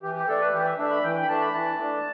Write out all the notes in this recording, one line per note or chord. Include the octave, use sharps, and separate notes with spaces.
E3 G4
G4
A3 D4 A4
B4
E3 G4
E5
A3 D4 E5
B5
E3 G5
G5
B5
A3 D4 A5
B5
E3 A5
A3 D4